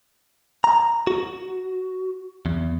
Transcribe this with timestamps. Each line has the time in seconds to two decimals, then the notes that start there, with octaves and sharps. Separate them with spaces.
0.64 A#5
1.07 F#4
2.46 E2